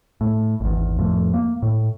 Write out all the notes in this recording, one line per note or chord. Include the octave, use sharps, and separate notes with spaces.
A2
G#1 E2
F2 A2
A#3
A2